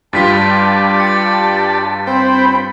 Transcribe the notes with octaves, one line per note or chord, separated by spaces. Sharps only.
G2 G3 F4 G4 A5 A6 B6
G4 D5
A5 A6 C#7
C4 C5 G5 B5